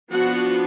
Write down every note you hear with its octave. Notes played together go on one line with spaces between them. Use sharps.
F3 B3 D4 F#4 F#5